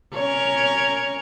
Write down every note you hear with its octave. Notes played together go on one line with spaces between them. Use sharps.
C#4 A#4 C#5